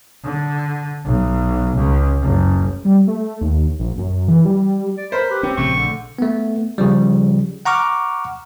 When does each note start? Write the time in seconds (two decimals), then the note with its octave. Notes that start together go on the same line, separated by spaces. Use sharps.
0.24 D3
1.05 B1
1.76 C#2
2.22 F#1
2.85 G3
3.07 A3
3.41 D#2
3.79 A#1
3.98 F#2
4.28 E3
4.45 G3
4.97 D5
5.12 A#4 C5 B5
5.30 G4 B4
5.43 C4 C#4
5.57 A#1 C#3 A3 C#6
5.76 D3
6.19 A3 B3
6.78 C#3 F3 G3
7.66 F#5 A#5 C#6 D6 F6